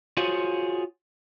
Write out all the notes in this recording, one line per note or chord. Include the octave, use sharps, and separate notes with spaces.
F4 F#4 G#4 C5 C#5